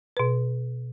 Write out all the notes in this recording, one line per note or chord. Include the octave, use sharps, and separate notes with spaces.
B2 B4